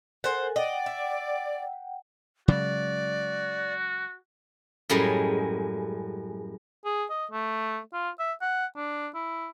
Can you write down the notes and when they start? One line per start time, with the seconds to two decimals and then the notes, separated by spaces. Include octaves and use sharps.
0.24 A4 A#4 C5 F#5 G#5
0.56 D5 D#5 F#5 G5
0.86 E5
2.48 C#3 F#3 G#3 F#4 D5
4.89 F#2 A2 G3 G#3
6.85 G#4
7.10 D#5
7.31 A3
7.93 F4
8.19 E5
8.41 F#5
8.76 D4
9.15 E4